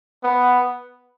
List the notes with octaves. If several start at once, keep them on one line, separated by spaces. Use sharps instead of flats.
B3